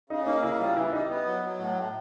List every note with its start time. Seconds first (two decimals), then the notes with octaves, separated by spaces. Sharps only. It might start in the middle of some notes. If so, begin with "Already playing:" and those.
0.10 C#3 D#4
0.26 A#3 D#4
0.43 C#3 E4
0.60 G3 F4
0.76 E3 E4
0.93 G3 D#4
1.09 B3
1.26 F#3
1.43 F#3
1.59 A2
1.76 A2